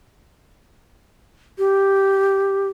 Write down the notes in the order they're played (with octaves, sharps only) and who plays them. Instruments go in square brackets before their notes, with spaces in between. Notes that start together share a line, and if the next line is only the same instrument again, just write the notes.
[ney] G4